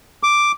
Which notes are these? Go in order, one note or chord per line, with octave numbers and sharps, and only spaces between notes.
D6